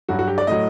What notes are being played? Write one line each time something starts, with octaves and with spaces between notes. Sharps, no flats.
G2 F#3 F#4
F#4
G4
D5
A2 F#3 D#5